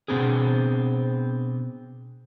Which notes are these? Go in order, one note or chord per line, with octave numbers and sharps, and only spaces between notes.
B2 E3 B3 C4 D4 G#4